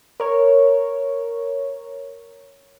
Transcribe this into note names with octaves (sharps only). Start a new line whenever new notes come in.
A#4 C#5